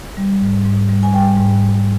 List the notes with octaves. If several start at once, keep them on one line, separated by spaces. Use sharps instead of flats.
G3
G#2
G#2
G3
G#5
G3 G5
G#2
G#2